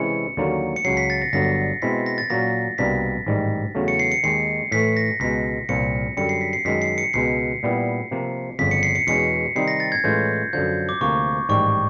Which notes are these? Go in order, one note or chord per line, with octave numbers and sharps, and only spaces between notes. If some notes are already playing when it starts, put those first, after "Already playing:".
Already playing: C3 E3 G#3 C#4 E4 C#7
D#2 D3 F#3 A#3 C#4
C#7
C#2 C#3 F#3 C7
B6
A6
A#6
G1 G2 D3 F#3 A#6
B2 G#3 C4 E4 B6
A#6
A6
A#2 F#3 A#3 C#4 A#6
C2 B2 G3 A#3 D4 B6
A1 G#2 D#3 G3
E2 C#3 F#3 A3
C#7
C7
C#7
D#2 D#3 G#3 C7
A2 E3 A3 B6
A#6
C#2 B2 G#3 B6
C2 A#2 F3 C#7
F#2 D3 G3 C#7
C7
B6
C7
F#2 D#3 G#3 B6
C7
C#7
C#2 B2 G#3 C7
A#2 G3 B3 E4
C3 F3 A#3
G1 F2 C#3 B6
C#7
C7
C#7
E2 B2 G#3 C#4 C#7
C3 D#3 G3 C4 D#4 C7
A#6
A6
G#6
A2 E3 G#3 C#4 F4 G6
F#2 D3 F3 G6
D6
D2 C3 F3 A#3 C#6
A1 G#2 D#3 G3 C#6